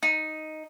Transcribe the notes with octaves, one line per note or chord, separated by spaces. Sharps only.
D#4